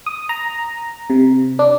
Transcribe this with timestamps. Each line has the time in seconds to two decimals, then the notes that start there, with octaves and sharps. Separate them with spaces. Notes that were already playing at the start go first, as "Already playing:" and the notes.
0.06 D#6
0.29 A#5
1.10 C3
1.59 D4